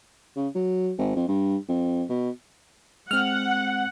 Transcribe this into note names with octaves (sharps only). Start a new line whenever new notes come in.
C#3
F#3
G#1
F2
G2
F2
B2
G#3 C4 F#5 F6